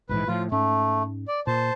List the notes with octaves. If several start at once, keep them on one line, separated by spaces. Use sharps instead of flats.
A#1 G#2 E3 B4
A2 F3 F4
G#2 A3 C#4
D5
A#2 C5 A5